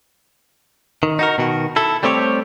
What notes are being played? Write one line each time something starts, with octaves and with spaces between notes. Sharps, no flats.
D#3
D#4 F#4 A#4
B2 D#3 F#4
E4 A4
G3 A3 C4 G4 C#5